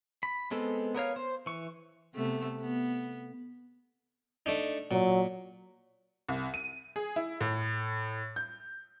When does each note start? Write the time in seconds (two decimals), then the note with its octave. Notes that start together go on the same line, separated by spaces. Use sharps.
0.23 B5
0.51 G#3 B3 C4 A4
0.95 B3 A#4 C#5 F5
1.16 C5
1.46 E3 C#6
2.14 C3 A3 B3
2.61 B3
4.46 A3 D4 D#4
4.91 A#2 F#3
6.28 C2
6.54 D#7
6.96 G#4
7.16 E4
7.41 A2
8.36 G6